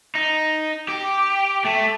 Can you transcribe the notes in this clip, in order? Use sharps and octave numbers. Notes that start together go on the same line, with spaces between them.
D#4
G4
A3